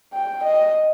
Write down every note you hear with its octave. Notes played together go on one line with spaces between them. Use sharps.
G5
D#5